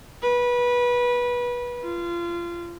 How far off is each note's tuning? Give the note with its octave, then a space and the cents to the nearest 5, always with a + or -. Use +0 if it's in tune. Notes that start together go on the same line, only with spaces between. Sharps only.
B4 -20
F4 -25